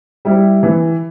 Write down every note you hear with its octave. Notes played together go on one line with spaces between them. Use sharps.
G3 E4
E3